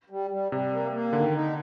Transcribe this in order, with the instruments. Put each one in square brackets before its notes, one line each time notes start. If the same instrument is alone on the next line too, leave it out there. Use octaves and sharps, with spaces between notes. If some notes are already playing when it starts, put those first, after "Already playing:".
[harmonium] G3
G3
[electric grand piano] C3 [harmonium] G3
[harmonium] A#3
A#3
[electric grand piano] D3 [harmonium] D#3
[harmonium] D#4